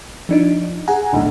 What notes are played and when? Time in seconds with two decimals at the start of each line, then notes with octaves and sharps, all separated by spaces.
0.29 F3 D4 D#4
0.88 G#4 F#5 G#5 A#5
1.12 B1 A2 D3